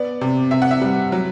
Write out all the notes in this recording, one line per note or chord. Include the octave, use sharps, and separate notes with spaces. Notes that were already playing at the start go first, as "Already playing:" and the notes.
Already playing: B3 D5
C3
C3 E5
F#5
E5
G3
F#3